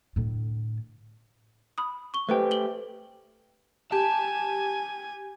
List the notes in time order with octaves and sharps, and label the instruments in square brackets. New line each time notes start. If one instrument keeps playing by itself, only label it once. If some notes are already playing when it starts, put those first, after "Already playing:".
[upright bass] A2 D3
[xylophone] B5 D#6
C#6 G7
[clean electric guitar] A3 G4 [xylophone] B4 C5 G5
[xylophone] F#7 G7
[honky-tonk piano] G4 [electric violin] G#5 [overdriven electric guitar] A5